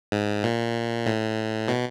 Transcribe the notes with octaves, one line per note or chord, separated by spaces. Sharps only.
G#2
A#2
A2
B2